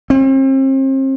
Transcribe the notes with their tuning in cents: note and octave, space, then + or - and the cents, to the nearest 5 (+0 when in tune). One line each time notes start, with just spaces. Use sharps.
C4 +40